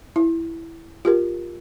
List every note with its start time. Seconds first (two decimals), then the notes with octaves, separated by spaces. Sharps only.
0.16 E4
1.05 F4 G4 A#4